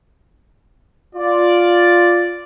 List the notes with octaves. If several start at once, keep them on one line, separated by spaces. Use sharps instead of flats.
F4 D5